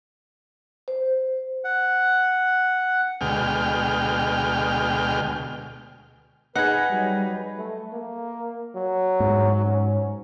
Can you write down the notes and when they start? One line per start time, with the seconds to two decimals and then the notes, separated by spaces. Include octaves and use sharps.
0.88 C5
1.64 F#5
3.21 D2 B2 G#3 G5 F6
6.55 D#4 G#4 B4 F#5
6.90 F#3 G3
7.57 A3
7.93 A#3
8.75 F#3
9.20 G#2
9.65 C#4